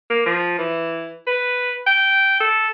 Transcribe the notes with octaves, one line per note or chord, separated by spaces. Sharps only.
A#3
F3
E3
B4
G5
A4